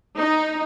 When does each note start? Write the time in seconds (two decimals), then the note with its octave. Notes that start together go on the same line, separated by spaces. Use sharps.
0.19 D#4